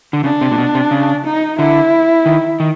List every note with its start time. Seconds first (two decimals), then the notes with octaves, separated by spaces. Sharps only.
0.13 D3
0.24 C#3 D4
0.41 C3
0.51 A#2
0.58 B2
0.75 C3
0.91 C#3
1.25 D#4
1.59 D3 E4
2.26 D#3
2.60 D#3